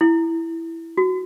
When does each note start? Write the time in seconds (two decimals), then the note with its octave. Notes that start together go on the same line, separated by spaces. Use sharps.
0.01 E4
0.98 F#4